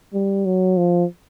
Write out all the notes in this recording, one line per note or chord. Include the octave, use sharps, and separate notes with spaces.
G3
F#3
F3